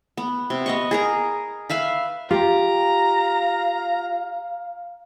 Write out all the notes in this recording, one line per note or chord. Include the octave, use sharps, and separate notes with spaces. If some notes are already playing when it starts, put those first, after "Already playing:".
B3
C3
B3 D#5 C#6
G#4 A#4 A#5
B4 E5 F5 B5
F4 G4 F5 G5 A#5